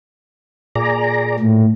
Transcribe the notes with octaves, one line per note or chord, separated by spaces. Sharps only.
A#2 G#4 D5 A#5
A2